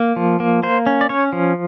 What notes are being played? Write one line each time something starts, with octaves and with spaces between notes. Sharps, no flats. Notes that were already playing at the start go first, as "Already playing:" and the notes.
Already playing: A#3
F3
A#3
A#3 C5
C#4
D5
C#4 C#5
F3